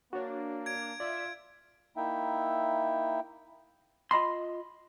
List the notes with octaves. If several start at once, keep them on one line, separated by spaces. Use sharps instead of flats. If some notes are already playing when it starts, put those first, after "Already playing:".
A#3 D4 F#4 C#5
G#6 D7
F4 D5 E5
A#3 D#4 E4 E5 G5
F4 D#5 B5 C6